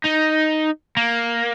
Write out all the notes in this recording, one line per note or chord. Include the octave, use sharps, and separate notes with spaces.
D#4
A#3